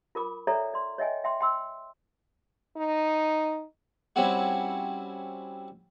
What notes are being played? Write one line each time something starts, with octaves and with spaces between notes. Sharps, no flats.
F4 A#4 B5 D6
A4 C#5 D5 E5 G5 A#5
D5 C6
C#5 D#5 E5 G5 G#5
E5 G5 C6
G5 C6 E6
D#4
G3 C4 C#4 E4 F#4